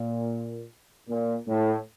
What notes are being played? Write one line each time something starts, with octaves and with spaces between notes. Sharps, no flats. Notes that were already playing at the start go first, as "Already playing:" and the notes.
Already playing: A#2
A#2
A2